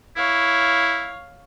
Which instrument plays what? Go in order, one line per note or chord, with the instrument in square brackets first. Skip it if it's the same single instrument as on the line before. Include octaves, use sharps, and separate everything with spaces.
[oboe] E4 [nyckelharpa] C#5 F5